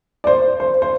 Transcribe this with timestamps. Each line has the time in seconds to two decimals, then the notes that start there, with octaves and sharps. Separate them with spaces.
0.24 D5
0.27 C5
0.60 C5
0.82 C5